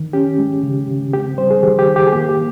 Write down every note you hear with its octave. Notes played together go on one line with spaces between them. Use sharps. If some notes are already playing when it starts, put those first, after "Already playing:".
Already playing: D#3
C#4 G4
G#3
C#3
C#3
C4 G4
G3 C5
G#4
D#3 G4
G4
D#3
G4
G#4
A#3 G4
G4